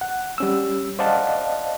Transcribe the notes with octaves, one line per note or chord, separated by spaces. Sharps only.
F#5
G3 C#4 E6
C5 D5 D#5 F5 F#5 A5